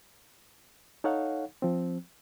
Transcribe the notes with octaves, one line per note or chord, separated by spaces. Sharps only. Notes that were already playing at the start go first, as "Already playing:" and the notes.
D#4 A4 C#5 F5 F#5
F3 C4